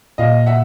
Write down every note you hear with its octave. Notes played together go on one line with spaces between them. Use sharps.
A#2 D#5 F5
E5 F#5